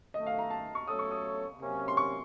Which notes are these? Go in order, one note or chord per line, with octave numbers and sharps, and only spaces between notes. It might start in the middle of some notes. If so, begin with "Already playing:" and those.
F#2 D#3 A3 D#5
F5
A#5
A5
C#6
F#3 A3 C#4 A4 C#5 D#6
C#6
D#6
C3 F#3 A#3 C#4
C6
C#6